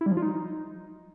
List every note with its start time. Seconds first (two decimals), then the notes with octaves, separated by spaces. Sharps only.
0.01 E4
0.06 G3
0.12 F3
0.17 F4
0.22 D#4